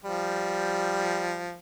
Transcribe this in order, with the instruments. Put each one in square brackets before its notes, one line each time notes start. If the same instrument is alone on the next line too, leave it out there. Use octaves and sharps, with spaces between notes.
[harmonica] F3 G3